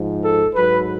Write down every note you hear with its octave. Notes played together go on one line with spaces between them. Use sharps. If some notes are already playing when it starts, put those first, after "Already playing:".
Already playing: G#2 F3
A4
G#2 F#3 B4